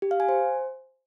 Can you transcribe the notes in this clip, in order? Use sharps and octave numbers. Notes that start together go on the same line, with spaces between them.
G4
F5
G#5
C5